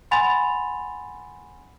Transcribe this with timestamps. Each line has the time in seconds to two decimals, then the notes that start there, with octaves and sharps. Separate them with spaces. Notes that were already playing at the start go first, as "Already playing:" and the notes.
0.11 F#5 G#5 B5 C6 A6 F7